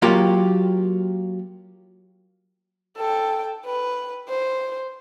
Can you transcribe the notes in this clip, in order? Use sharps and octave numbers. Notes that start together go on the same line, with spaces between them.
F#3 A#3 F4 G4
A4 G5
B4
C5